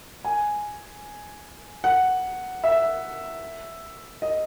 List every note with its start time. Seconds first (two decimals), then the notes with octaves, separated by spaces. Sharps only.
0.25 G#5
1.84 F#5
2.64 E5
4.22 D#5